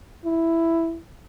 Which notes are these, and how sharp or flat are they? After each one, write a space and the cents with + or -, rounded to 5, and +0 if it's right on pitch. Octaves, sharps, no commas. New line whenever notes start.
E4 +5